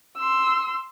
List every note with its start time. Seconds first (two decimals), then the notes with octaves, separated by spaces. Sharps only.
0.18 C6 E6